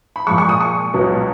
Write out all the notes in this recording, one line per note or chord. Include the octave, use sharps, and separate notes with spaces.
B5
A#2 F3 G#3 C#6
C#6
D#6
C#6
C#2 B2 F#3